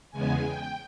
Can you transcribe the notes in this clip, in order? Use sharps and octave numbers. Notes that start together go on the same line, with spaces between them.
E2 C#3 G#3 B3 G#5
G5